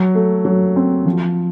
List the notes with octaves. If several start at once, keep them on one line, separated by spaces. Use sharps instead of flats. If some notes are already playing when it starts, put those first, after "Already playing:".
Already playing: F#3
A3
F#3
C4
F3